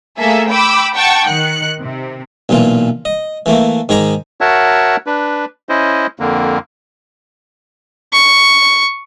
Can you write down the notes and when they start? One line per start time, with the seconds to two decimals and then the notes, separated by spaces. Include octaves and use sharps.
0.18 A3 A#3 G#4 A4 E5
0.50 G5 B5 D6 E6
0.95 F#5 G5 A5 C#6
1.27 D#3 F#6 C#7
1.81 C3
2.49 B1 A#2 E3 F4
3.05 D#5
3.46 E3 A3 A#3
3.89 G#2 D#3 G#4 G5 A#5 D6
4.41 F#4 A#4 C#5 E5 F#5 A5
5.07 D4 B4
5.69 C#4 E4 C5 D#5
6.20 F2 D3 A#3
8.13 C#6